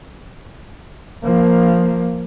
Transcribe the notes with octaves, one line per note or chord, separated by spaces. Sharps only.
F3 A#3